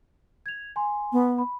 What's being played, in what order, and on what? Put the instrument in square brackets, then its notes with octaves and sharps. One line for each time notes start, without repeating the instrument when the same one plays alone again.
[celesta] G#6 F7
G#5 C6
[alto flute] B3
[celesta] B5